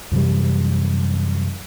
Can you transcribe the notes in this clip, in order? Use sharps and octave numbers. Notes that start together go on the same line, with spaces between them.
F#2 C3 E3 G3